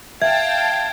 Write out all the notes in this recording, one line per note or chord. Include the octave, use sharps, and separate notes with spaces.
E5 F5 G5 A5 G#6